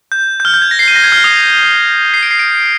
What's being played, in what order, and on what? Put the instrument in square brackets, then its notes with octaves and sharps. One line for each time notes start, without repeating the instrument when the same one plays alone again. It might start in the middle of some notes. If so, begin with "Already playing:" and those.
[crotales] G6
G6
F6
G6
G#6
A#6
C7
D#7
A#6
G#6
F6
D#6
C7
D7
C7
D7